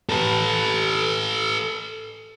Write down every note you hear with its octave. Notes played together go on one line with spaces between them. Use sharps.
A4 B4